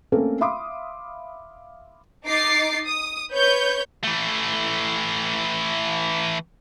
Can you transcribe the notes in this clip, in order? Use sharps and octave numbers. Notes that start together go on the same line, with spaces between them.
A3 A#3 C4 C#4 A4 A#4
E5 F5 B5 C6 D6 D#6
D#4 D6 A6 C7
D#6
B4 C#5 G6
E3 A3